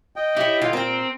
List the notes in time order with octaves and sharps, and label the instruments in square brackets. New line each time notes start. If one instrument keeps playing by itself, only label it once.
[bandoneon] D#5 G5
[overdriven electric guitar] E4 [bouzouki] G4 C#5
[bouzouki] D3 [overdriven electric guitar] F4
[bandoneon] A#2 [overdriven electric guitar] C4 [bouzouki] A#4 G5